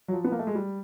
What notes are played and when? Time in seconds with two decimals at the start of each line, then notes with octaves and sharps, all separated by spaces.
0.08 F#3
0.13 F3
0.24 B3
0.32 A#3
0.39 A3
0.47 G#3
0.55 G3